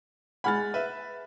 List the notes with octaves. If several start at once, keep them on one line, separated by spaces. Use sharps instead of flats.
G#3 F#5 G#5 B5 F6 A6
B4 E5